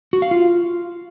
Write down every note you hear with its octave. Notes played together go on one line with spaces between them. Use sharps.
F#4
F5
F4